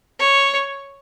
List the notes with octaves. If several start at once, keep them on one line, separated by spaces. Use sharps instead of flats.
C#5